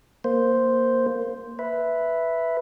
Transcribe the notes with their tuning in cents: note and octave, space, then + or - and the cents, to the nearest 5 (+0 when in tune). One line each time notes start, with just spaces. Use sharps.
A#3 +0 C5 +0
B4 +0 E5 +0